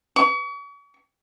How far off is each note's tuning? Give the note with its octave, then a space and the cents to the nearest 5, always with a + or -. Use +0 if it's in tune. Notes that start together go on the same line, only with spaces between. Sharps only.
C#6 +40